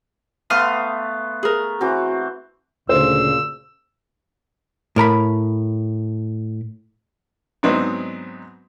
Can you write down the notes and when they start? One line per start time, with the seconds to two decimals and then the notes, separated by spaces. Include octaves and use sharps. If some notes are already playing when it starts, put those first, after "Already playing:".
0.50 A3 B3 F5 C6 D#6
1.43 G#4 A#4
1.81 E3 C4 F#4
2.89 D2 A#2 C#3 C5 E6
4.96 A2 A#4 A#5 B5
7.63 G#2 F#3 B3 C4 D4 D#4